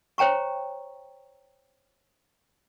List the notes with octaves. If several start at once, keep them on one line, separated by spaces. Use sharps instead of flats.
C5 C#5 G5 A#5 C#6